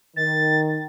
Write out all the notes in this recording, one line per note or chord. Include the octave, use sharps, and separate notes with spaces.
D#3 A6